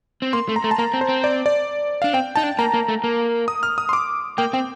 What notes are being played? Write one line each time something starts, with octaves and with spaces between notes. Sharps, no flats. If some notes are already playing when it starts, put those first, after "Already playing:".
C4
A#3 C6
A3
A#5
A3
A5
A#3 A#5
C4
C5
C4
D5
D5
D4 F5
C4 G5
D#4 A5
D4
A#3 A#5
A#3
A3
A#3
D#6
F6
D#6
C6
D6
A#3 G5
C4 G5